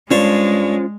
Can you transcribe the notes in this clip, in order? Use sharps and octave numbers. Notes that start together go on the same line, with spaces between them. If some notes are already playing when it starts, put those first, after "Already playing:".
G2 G#3 C#4 F4 C5 C#5 A5